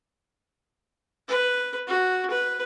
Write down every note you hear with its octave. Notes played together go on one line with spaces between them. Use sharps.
B4
F#4
B4